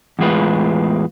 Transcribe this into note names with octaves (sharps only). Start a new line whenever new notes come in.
E2 A2 G#3 F4 B4